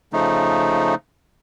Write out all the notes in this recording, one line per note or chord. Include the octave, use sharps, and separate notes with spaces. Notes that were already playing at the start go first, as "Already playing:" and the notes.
C#3 F3 A3 D#4